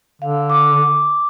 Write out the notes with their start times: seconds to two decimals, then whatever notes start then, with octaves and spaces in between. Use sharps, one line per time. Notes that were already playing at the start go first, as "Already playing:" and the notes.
0.22 D3 F5
0.50 D6